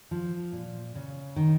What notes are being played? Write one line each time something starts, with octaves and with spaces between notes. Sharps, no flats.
F3
A#2
C#3
D#3